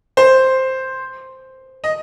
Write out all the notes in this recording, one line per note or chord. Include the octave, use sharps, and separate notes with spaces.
C5
D#5